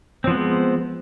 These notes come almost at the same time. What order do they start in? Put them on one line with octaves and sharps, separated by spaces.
C4 F3 B3 G#3